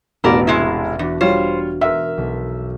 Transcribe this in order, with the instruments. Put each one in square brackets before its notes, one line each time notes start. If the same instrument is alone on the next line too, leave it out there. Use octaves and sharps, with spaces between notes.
[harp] E1 [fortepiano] A1 B2 A#5 [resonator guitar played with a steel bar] E4 A#4 D5
[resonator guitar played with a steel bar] C3 G#3 E4 [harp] E5 C7
[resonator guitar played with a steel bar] E2 [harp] D4 F#4
[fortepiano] G3 F4 C#5 [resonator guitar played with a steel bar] C5
[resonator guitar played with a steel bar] G#2 [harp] A#4 F6 [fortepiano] E5
[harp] B1